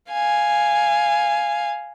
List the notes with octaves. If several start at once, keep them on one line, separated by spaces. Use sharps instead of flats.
F5 G#5